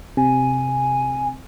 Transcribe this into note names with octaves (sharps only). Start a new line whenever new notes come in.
C3 G#5